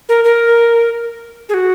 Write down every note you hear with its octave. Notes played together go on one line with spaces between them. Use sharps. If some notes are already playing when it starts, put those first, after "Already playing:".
A#4
A#4
G#4
F#4